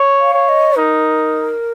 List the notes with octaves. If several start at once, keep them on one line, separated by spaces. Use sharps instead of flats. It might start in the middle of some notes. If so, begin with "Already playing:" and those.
Already playing: C#5
F5
C#5
D#5
D#4 A#4